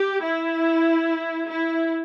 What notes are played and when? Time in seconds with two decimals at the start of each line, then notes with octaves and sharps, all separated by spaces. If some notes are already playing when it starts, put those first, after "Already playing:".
Already playing: G4
0.23 E4
1.48 E4